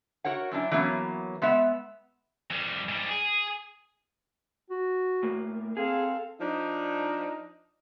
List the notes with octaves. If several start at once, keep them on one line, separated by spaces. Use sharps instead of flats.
F#4 A#4 C#5 F#5
F#2 C#4 D4 E4
E3 F#3 A#3 B3 C#4
G#3 B3 E5 F#5
F2 G3
G#2 G3
G#4
F#4
A2 A#3
C4 G#4 A4 F5
F3 D4 D#4